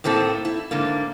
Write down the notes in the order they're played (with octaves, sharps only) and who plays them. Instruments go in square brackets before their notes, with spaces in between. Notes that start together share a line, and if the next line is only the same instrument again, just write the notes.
[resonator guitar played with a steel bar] A2 A#3 C4 E4 A4
E4
G#2 D3 A#3